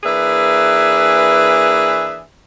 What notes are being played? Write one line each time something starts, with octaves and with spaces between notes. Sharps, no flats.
E3 A#3 D4 G#4 B4 E5